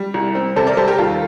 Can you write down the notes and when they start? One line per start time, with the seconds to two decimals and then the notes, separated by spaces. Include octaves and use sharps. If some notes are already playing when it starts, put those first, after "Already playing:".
Already playing: G3
0.14 C2
0.35 C4
0.56 C3 A4 C5
0.67 A#4 D5
0.77 G3 A4 C5
0.88 G4 A#4
0.98 D#2 F4 A4